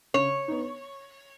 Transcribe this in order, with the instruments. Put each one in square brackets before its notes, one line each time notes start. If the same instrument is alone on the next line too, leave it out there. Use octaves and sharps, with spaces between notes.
[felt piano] C#3 [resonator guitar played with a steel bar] C#5
[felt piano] B3 D#4